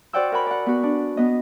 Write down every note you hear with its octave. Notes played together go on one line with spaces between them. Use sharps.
F#4 C5 D5 F#5 G5 E6
A#4 F#5 G#5 B5
D5 F#5
B3 F#4
D4
B3 D#5